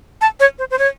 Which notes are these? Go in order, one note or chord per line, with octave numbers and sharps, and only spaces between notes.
A5
C#5
C5
C5
C#5